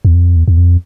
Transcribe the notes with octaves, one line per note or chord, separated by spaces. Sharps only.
E2
F2
E2
E2
F2